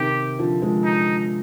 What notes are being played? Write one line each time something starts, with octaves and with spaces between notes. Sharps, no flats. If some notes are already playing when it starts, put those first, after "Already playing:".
Already playing: C3 D#3 G4
D3 F3
F3 G#3
D#4